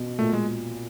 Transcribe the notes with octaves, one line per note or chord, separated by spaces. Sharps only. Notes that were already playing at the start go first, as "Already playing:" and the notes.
Already playing: B2
A#2 A3
G#3